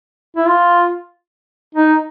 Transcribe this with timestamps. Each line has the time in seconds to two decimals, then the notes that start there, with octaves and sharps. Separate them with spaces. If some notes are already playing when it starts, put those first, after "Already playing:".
0.37 E4
0.48 F4
1.75 D#4